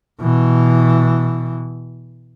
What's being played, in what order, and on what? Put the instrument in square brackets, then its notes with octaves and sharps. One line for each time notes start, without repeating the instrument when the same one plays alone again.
[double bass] B2 E3